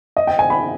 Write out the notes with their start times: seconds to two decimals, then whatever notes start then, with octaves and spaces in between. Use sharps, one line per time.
0.17 D#5
0.27 G5
0.39 G#5
0.50 B5